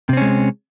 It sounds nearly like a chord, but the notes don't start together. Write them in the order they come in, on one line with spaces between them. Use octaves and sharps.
C3 C4 C#4 G#3